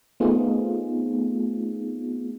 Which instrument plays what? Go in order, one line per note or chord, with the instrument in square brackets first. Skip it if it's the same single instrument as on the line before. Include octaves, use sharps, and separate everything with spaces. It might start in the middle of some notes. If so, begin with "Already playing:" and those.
[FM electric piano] A3 B3 C4 D#4 F4 G#4